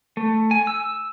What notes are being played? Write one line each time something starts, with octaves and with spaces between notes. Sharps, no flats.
A3
G#5
E6